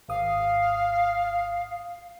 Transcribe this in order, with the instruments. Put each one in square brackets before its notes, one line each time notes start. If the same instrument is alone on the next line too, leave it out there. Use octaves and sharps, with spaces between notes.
[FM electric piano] G#1 D#6 [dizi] F5